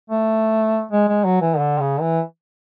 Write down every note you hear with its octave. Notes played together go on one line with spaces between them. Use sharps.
A3
G#3
G#3
F#3
E3
D3
C#3
E3